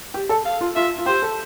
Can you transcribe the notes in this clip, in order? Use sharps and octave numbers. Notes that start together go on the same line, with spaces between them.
G4
A4
F5
F4
F4 E5
F4
G4 C5
A4